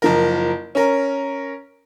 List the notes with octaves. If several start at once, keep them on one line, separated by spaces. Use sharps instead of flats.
F#1 F3 A#4
C#4 A#4